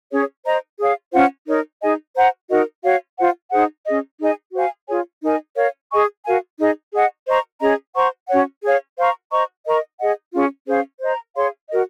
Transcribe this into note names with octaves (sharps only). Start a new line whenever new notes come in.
C#4 G#4 C#5
C5 D#5 A#5
G#4 C#5 F5
C#4 F4 C5 F#5
D#4 A#4 C#5
D#4 G#4 D#5 G#5
C5 F#5 A#5
D#4 F#4 A#4 D#5
F#4 C#5 F5
F4 C5 F#5
D#4 G#4 C5 F#5
C#4 G#4 D#5
D#4 G#4 D#5 G#5
F#4 C5 F5 G#5
F4 G#4 C#5 G#5
D#4 A#4 D#5 G#5
A#4 C#5 F5
G#4 D#5 G#5 C#6
F#4 A#4 F5 G#5
D#4 G#4 D#5
G#4 D#5 F#5
C5 D#5 A#5 C#6
C#4 G#4 D#5 A#5
C5 F#5 A#5 C#6
C#4 F#4 C#5 F#5
G#4 C#5 F5
C5 F5 A#5 C#6
C5 D#5 A#5 C#6
A#4 D#5 A#5 C#6
G#4 D#5 F#5
C#4 F4 G#4
C#4 G#4 C5 F5
C5 D#5 A#5
G#4 C#5 F5 C6
F#4 A#4 D#5